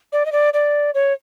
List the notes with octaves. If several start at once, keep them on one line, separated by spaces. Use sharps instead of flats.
D5
D#5
D5
D5
C#5